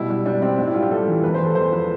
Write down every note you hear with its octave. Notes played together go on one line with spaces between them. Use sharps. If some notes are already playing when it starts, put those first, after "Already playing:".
Already playing: B2 G3 E4
G3
G3 D4
G3 C4
A2 D4
E4
G3 F4
G4
G3 A4
E3
E2 B4
C5
E2
A4
E2 C5
F3 B4